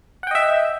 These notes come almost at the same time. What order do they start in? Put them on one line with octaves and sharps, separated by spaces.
F#5 G5 D#5 E5